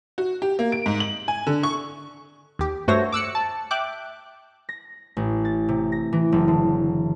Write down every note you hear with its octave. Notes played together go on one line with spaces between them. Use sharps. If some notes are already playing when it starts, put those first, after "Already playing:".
F#4
G4
A#3
D7
G#2
F#7
G#5
D3
C#6
D#2 G4
G2 A3 F#4 C5 C#5 A#6
D6 E6 F#6 C#7
A5
E5 G5 D6 F#6
A#6
A1
A6
C3
A#6
E3
F#1
D3